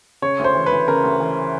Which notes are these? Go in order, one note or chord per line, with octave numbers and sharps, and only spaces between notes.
C#3 C#5
D2
C5
E3
D2 B4
C#3 A#4
D2
E3